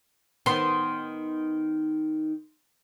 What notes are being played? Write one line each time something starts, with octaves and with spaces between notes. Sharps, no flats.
D#3 B3 C6